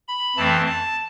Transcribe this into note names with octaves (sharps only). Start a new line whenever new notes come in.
B5
F2 E3 A3 C4 A5
A5